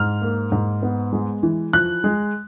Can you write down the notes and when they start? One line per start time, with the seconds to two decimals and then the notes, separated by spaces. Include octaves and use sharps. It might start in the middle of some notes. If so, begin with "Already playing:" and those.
Already playing: G#2 F6
0.22 A#3
0.52 G#2
0.83 B3
1.13 G#3
1.43 E3
1.73 F3 F#6
2.04 G#3